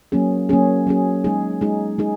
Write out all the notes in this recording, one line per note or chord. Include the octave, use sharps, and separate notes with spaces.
F#3 A#3 C#4 G#4
F#3 A#3 C#4 G#4
F#3 A#3 C#4 G#4
G#3 D#4 G#4
G#3 D#4 G#4
G#3 D#4 G#4